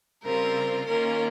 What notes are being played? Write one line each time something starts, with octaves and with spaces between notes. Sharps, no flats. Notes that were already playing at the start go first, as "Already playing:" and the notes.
C#3 G3 C4 F4 A#4
D#3 A#3 C#4 F4 A#4